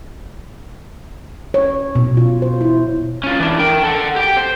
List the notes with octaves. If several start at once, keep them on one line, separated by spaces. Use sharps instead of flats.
C#5
B2
F4
C5
E4
C#4 F4
E3 D4
A#4 G5
A4 F#5
G4 G5
C5